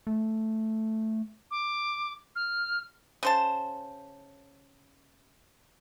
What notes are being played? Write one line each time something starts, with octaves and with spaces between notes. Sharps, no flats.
A3
D6
F6
C#3 C5 A5